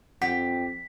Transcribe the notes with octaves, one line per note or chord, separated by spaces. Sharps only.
F2 G4 F#5 B6